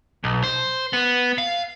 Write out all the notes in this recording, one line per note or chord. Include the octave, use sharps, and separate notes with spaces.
B1
C5
B3
F5